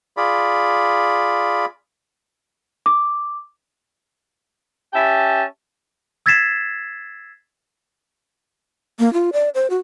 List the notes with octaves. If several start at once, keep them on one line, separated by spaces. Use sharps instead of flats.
F4 G#4 D5 B5
D6
C#4 G4 E5 G5 A5
E6 G#6 A6 B6 C7 E7
A#3
F4
D5
C5
F#4